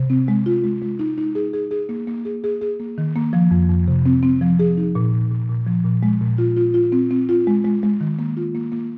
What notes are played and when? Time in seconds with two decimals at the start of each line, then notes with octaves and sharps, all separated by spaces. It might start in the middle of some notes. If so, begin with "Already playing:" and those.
Already playing: C3
0.10 C4
0.28 G#3
0.46 F4
0.64 G#3
0.82 G#3
0.99 D#4
1.18 D#4
1.35 G#4
1.53 G#4
1.71 G#4
1.89 A#3
2.07 A#3
2.25 G#4
2.44 G#4
2.61 G#4
2.80 A#3
2.98 D#3
3.16 A#3
3.33 F3
3.51 F2
3.69 F2
3.88 C3
4.06 C4
4.23 C4
4.41 F3
4.59 G#4
4.77 D#4
4.95 A#2
5.13 A#2
5.32 A#2
5.49 A#2
5.67 F3
5.84 A#2
6.03 G#3
6.21 A#2
6.38 F4
6.57 F4
6.74 F4
6.92 C4
7.11 C4
7.29 F4
7.47 G#3
7.64 G#3
7.83 G#3
8.01 D#3
8.19 A#3
8.37 F4
8.55 A#3
8.72 A#3